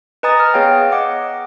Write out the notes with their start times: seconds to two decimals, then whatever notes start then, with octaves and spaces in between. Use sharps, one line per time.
0.23 B4 D#5 G#5 A#5 D#6 A6
0.40 F6
0.54 B3 G#4 C#5 F5 G5
0.92 D#5 F#5 D6